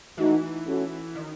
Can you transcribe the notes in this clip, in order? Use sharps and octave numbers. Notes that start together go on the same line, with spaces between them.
E3 A3 D#4 F#4
A3 C#4 F#4
D#3